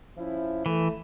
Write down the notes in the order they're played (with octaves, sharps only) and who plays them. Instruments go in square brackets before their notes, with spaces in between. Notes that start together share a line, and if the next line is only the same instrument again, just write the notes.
[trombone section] F3 C#4 E4
[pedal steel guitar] E3 [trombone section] A3